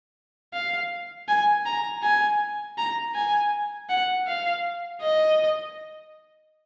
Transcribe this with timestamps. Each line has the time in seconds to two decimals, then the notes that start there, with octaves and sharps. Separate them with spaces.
0.54 F5
1.29 G#5
1.66 A#5
2.03 G#5
2.78 A#5
3.15 G#5
3.90 F#5
4.27 F5
5.02 D#5